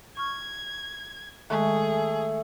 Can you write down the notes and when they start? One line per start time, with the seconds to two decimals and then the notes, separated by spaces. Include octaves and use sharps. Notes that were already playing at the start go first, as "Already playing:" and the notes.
0.17 C#6 F6 G#6
1.50 D#3 G#3 A3 G#4